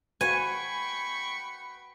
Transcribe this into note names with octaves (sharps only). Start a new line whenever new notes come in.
F#4 B4 G5 G#5 B5 C#6